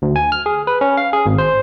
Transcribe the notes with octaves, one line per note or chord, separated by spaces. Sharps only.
D2
G#5
F6
G#4
B4
C#4
F5
G#4
G#1
C5